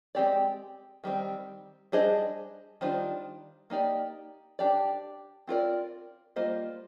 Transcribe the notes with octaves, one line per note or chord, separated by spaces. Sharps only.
G#3 C4 G4 D5
D#3 G3 C4
G3 D4 G#4 C5 D#5
D#3 G3 D4 F4 C5
A#3 D#4 G4 D5
D4 G4 D5
C4 F4 A#4 D5
G3 A#3 F4 C5 D#5